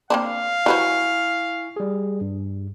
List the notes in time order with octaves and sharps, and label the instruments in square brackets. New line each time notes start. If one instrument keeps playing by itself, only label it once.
[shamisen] A#3 C4 D4 [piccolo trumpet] F5
[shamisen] F#3 B4 C5 [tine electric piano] E4 G#5 C#6
[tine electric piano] G3 G#4
G2